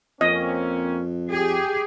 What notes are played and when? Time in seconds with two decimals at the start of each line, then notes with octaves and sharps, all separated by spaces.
0.21 F2 A#3 C4 C#4 D#5
1.31 G4 G#4